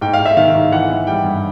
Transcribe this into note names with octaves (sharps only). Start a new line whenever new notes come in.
G#2 G5
F5
G#2
E5
D#3 F5
G#2
E3 F#5
E3
G3 G5
G2